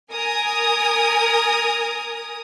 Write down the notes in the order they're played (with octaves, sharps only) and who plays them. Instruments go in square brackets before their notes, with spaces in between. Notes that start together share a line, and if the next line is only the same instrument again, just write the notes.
[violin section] A#4 G#5 D#6